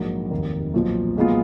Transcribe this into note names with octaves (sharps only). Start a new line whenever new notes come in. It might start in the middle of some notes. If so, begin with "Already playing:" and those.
Already playing: A#1 G#2 F#3 A#3
F1 D#2 D#3 A#3
B1 A#2 F3
B1 A#2 G#3 B3 F4